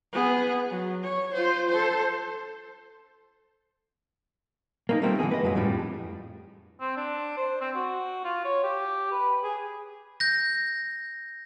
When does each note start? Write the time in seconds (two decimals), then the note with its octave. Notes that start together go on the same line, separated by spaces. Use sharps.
0.13 B3 G#4
0.70 F#3
1.03 C#5
1.34 F4 C5
1.69 A4 C5
4.89 A#3 C#4 D#4
5.02 G3 A3 A#3 C4 F4
5.19 D3 E3 G3 A#3 G#4
5.31 B4 D#5
5.43 F#2 F#3 G#3
5.55 F2 A2 F3 G3 D4
6.80 C4
6.96 D4
7.37 C5
7.61 C4
7.75 F#4
8.24 F4
8.45 C#5
8.63 G4
9.12 B4
9.44 G#4
10.20 G6 A#6